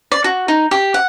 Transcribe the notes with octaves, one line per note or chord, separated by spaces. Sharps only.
D5
F#4
D#4
G4
F#5